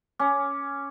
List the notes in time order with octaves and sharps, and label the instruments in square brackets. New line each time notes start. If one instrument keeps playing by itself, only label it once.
[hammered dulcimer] C#4 [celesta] D6